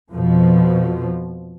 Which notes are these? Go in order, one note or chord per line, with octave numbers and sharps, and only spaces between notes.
F2 B2 F3